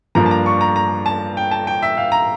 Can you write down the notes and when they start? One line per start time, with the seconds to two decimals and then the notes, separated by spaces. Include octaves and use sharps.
0.15 G2 F3 A#3 D4 A#5
0.26 A5
0.31 A#5
0.46 C#6
0.61 A#5
0.76 A#5
1.06 A5
1.37 G5
1.51 A5
1.67 G5
1.82 E5
1.97 F5
2.12 A#5